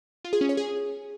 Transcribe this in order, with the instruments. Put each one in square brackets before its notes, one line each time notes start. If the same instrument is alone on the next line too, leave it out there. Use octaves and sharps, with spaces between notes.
[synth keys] F4
G#4
C#4
C#5
G#4